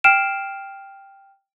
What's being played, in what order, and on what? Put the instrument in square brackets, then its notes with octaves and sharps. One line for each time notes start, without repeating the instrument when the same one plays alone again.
[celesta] G5 F6 C7 D7 E7